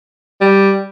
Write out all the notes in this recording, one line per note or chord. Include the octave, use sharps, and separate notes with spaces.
G3